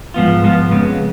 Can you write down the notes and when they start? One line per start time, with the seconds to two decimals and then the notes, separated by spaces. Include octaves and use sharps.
0.14 G#2 F3 B3 F4
0.43 G#2 F3 B3 F4
0.71 F2 C#3 G#3 B3